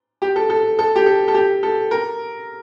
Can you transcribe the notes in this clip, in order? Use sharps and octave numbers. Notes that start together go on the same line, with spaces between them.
G4
A4
A4
A4
G4
A4
A4
G4
A4
A#4